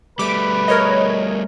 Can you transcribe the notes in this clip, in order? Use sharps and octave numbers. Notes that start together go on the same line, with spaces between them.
G3 A3 B4 D6 B6 D7
A#4 C#5 D#5